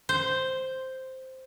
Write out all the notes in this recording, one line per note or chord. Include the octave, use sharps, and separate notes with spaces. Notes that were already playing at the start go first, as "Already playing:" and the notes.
C5